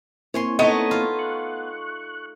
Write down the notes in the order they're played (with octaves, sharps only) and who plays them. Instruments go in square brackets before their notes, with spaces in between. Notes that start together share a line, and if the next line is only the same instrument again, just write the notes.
[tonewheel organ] A#3 C4 E4 [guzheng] C#5 G#5 C6
[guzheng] A3 D#4 C#5 [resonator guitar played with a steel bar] B3 D#5
[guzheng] F4
[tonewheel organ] C#6 F#6